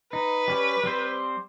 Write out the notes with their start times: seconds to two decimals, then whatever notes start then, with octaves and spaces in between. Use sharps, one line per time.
0.13 D#4 B4
0.48 G3 C#4 G4
0.83 G3 C4 C5